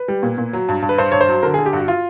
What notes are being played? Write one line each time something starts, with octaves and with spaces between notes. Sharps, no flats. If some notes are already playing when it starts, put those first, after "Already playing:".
Already playing: B4
G3
A#2
A#2
F#3
G2
G2
B4
G2 C5
G2 C#5
C5
F#3
D3 A#4
D3 G#4
G4
G2 F#4
F4